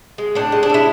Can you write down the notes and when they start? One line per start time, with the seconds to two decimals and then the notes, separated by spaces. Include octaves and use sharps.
0.18 G#3
0.35 A2 D4
0.52 G#3
0.63 D4
0.70 G#3 E4